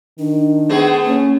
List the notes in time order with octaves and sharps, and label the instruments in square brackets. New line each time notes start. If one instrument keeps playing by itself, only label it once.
[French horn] D#3 [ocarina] D4
[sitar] A3 B3 G#4
[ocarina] A#3 [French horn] C#4